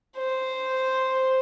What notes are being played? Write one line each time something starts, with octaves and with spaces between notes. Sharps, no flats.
C5